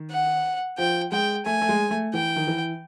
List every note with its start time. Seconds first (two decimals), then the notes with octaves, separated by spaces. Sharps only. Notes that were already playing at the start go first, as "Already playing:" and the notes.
Already playing: D#3
0.11 F#5
0.78 F3 G5
1.12 G#3 G5
1.46 A3 G#5
1.62 A3
1.69 G#3
1.91 A3
2.14 E3 G5
2.36 D#3
2.47 E3